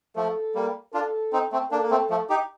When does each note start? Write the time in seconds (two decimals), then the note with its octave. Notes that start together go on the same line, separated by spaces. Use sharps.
0.16 F3 A3 A4
0.55 G3 A#3
0.93 D4 F4 A4
1.33 C4 D#4
1.52 A3 C4
1.71 A#3 D4 A4
1.82 A#3
1.91 A3 C4
2.10 F3 A3
2.30 D#4 G4